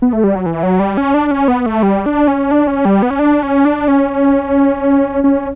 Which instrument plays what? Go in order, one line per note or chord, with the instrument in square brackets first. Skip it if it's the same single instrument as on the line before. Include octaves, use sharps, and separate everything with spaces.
[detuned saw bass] B3
A3
G3
F#3
E3
F#3
G3
C#4
D4
C#4
B3
A3
G3
D4
C#4
D4
C#4
G3
B3
C#4
D4
C#4
D4
C#4
C#4